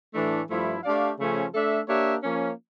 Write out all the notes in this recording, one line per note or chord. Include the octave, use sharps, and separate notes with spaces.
A2 E3 A3 D4
G2 F3 A3 E4
A3 D4 G4 D5 F5
C#3 F3 A3 C#4
A3 D4 A4 E5
A#3 D4 G4 C#5 E5
F3 A#3 C#4